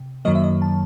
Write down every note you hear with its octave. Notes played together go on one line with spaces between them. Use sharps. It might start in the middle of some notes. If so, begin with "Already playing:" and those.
Already playing: C3
F#2 D#3 F#3 A#3 D#5
E5
D#5
A5